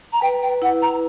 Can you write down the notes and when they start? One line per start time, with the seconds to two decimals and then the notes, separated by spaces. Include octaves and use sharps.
0.12 A#5
0.22 B4 G5
0.42 G5
0.62 E4 F#5
0.82 A#5